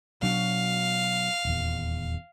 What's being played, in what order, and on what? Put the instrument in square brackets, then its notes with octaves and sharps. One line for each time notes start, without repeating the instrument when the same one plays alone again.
[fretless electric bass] B2 F#3 D4 [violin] F5
[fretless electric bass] D#1 E2